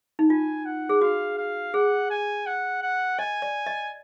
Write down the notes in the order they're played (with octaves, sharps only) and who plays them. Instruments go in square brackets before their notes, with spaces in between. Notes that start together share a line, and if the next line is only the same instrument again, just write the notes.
[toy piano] D#4
[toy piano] F4 [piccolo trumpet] G#5
[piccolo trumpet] F#5
[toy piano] G#4
[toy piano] F#4 [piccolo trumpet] F5
[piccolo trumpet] F5
[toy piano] G#4 [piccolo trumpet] F#5
[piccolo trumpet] G#5
F#5
F#5
[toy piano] D#5 [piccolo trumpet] G#5
[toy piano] D5
D#5